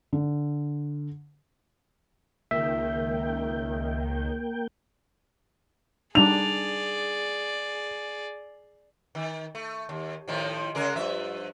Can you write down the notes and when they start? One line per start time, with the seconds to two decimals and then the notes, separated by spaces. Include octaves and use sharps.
0.13 D3
2.51 C#2 D#3 A#3 E5 G5
6.15 G3 D4 D#4 G#4 D5 F7
9.15 D#3
9.55 A3
9.89 D#2
10.28 A2 D#3 F3
10.75 C#3 G#3 A#4
10.96 G2 F3 E5